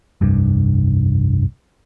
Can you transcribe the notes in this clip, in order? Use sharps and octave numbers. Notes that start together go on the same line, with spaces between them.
F1 C2 G2